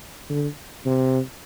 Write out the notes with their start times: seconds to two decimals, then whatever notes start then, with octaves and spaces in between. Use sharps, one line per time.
0.30 D3
0.85 C3